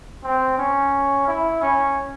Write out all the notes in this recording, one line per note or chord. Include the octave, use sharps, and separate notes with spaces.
C4
C#4
E4
C#4